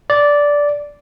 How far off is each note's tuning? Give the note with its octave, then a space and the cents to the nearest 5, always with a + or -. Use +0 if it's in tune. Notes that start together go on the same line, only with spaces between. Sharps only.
D5 -10